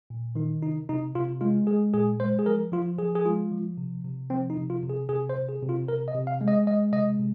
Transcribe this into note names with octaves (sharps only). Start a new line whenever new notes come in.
A#2
D#3 D#4
C3 D#4
C3 D#4
C3 F4
G#3 F4
G#3 G#4
A#2 G#4
G#3 C5
G#4
F3 A#4
F3 F4
F3 G#4
G#4
G#3 F4
F3
C3
C3
F3 C4
D#4
C3
F4
C3
G#4
C3 G#4
C5
C3
G#4
C3
F4
C3 A#4
D#5
C3
F5
G#3
D#5
G#3 D#5
C3 D#5
C3